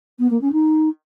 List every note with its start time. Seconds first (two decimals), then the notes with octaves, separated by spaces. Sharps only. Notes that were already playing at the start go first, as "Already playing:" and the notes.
0.19 B3
0.30 A#3
0.41 C#4
0.52 D#4